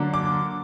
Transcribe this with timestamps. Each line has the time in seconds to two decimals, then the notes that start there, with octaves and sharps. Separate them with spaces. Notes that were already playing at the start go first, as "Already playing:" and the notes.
Already playing: D3 F#3 A#3 D4
0.14 D6